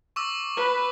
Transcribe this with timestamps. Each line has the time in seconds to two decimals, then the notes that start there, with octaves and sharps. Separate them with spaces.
0.16 C#6 D6 E6
0.57 B4